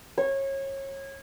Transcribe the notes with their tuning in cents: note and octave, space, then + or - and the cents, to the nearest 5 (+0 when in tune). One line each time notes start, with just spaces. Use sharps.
C#5 -25